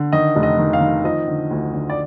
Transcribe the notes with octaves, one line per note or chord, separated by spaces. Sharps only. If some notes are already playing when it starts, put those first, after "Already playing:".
Already playing: D3
D#3 D#5
F1
D#5
D#3
F5
D#3
F3 D#5
D3
D2
D3
D5